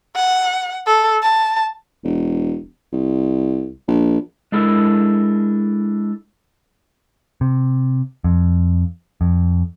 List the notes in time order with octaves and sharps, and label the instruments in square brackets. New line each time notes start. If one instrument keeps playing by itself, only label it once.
[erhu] F#5
A4
A5
[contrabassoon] E1
C2
A#1
[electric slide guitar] G#3 D4 E4 A4 A#4
[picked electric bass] C3
F2
F2